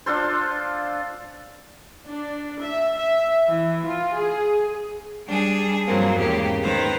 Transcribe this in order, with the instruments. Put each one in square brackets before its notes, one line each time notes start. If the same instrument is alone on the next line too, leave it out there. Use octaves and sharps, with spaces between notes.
[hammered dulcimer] D4 F4 A4 C5
[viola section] D4
E5
E5
E3
F4
G#4
[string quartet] G3 D4 G#4
G2 F3 F#3 A#3 C4
E2 G#2 C#3 A#3 G4
D#3 B4 C5 A#5